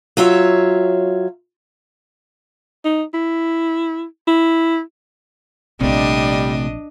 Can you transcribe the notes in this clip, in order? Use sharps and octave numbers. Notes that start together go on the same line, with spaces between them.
F#3 F4 C#5 E5
D#4
E4
E4
A#1 C3 G3 A3 C4 D4 D#5